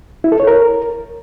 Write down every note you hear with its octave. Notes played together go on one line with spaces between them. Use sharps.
E4
A4
C#5
A#4